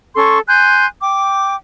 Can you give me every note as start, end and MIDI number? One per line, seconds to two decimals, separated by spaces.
0.16 0.40 61
0.16 0.40 69
0.16 0.40 84
0.16 0.40 85
0.47 0.86 80
0.47 0.86 84
0.47 0.86 90
0.47 0.86 91
1.01 1.55 79
1.01 1.55 86